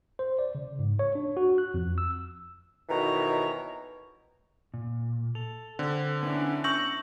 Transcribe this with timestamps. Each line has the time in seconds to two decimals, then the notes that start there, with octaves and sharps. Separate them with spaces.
0.19 C5
0.39 D5
0.55 C#3
0.79 G#2
0.99 C#5
1.15 D4
1.37 F#4
1.58 F#6
1.74 F2
1.98 E6
2.89 F2 B2 D#3 E3 C#5 A#5
4.74 A#2
5.35 A4 F7
5.79 D3 C4
6.23 B3 C#4 D4 E4
6.64 C#6 E6 G6 A#6 F#7